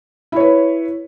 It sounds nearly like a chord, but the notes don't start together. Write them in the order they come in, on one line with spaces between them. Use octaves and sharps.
E4 C#5 B4